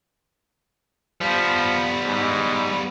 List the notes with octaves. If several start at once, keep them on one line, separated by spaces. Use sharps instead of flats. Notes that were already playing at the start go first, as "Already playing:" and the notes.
F3 G3 B3
G#2